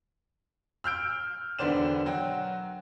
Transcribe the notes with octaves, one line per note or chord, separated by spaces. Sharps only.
E6 F6 G6 D7
E1 D3 B3 C5 D5 E7
F#3 F#4 G5